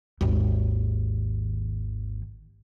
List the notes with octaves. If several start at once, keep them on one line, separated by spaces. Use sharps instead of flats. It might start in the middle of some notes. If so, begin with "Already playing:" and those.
G#1 D#2